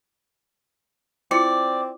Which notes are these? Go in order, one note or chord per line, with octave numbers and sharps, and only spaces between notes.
C4 E4 F4 D5